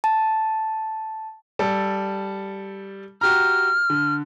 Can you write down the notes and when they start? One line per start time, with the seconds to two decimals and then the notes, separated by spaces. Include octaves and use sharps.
0.04 A5
1.59 G3 A4
3.21 F#4 G4 A#5 F6
3.90 D3